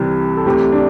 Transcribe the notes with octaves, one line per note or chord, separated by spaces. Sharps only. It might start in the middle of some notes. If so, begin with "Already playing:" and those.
Already playing: C2 C3 E3
A4
D2 C3 E3 G4
D4